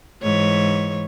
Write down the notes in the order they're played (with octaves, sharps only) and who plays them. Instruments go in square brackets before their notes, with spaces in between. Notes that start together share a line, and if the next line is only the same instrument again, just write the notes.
[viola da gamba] G#2 E3 C#5